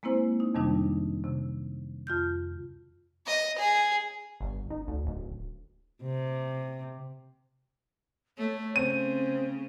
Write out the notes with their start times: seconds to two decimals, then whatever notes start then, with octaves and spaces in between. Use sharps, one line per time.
0.03 G#3 A#3 C4 E4 C5
0.40 D#4
0.54 F2 C3 D#3 G3 D4 D#4
1.24 C3
2.07 F2 F4 F6 G6
3.26 D#5
3.58 G#4
4.40 G1
4.70 D#4
4.88 D2
5.06 D1
6.03 C3
8.38 A3 C#5
8.76 C#3 C4 C5 D#7